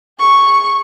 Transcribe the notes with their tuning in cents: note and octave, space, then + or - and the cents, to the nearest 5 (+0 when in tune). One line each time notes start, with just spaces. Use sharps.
G#4 -15 C#6 +0